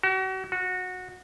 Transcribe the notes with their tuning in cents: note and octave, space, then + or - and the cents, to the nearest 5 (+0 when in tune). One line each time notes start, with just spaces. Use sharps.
F#4 +40
F#4 -15